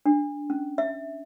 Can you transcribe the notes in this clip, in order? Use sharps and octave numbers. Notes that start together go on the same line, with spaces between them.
D4
C#4
E5